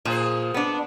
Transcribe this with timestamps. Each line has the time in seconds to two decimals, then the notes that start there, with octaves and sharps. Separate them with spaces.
0.05 A#2 F3 G#4 C5
0.54 B3 D4